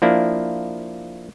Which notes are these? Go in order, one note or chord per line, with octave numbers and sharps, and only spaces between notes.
F3 A#3 D4 E4